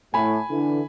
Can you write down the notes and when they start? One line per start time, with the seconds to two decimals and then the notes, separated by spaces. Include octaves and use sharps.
0.14 A2 G#5 B5
0.50 D3 E3 E4